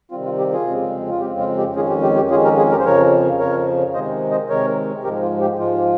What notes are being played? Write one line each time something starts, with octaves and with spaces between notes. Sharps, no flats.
C3 D#3 G3 C4 F4
F4
G4
F4 G#4
F2 C#3 G#3 C4
F4
F2 C#3 G#3 C4 G4
F4
G4
F2 D#3 G#3 C#4 F4 G#4
G4
G4
G4
F2 D#3 G#3 C#4 F4 G#4
G4 A#4
F4 G#4
G4 A#4
C5
F2 C#3 F3 A#4 C#5
F2 C#3 F3 A#4 C#5
C3 D#3 G#3 C5 D#5
C5 D#5
C3 D#3 G#3 A#4 C#5
G#2 F3 G#3 G4 A#4
F4
G4
G#2 F3 G#3 F4